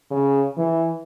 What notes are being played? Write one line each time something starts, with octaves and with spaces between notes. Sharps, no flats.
C#3
E3